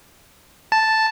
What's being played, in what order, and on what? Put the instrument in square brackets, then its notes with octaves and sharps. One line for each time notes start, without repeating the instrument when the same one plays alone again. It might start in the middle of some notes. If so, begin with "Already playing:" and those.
[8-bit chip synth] A5